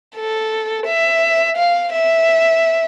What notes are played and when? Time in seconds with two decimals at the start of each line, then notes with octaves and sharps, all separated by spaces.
0.16 A4
0.86 E5
1.57 F5
1.93 E5